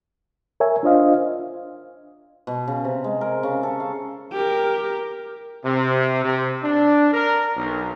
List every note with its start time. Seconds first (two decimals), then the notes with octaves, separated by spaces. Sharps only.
0.60 A#4 C#5 E5 G#5
0.83 D4 F4 C5 D#5 F5
2.47 B2
2.68 C#3
2.85 C3
3.04 G#3
3.21 A#4
3.43 C#3
3.63 A4
3.80 F5
4.33 G4 A#4
5.65 C3
6.24 C3
6.63 D4
7.13 A#4
7.56 B1